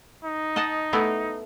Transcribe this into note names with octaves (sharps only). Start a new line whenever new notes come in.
D#4
D#5 F#5 A5
A3 B3 E4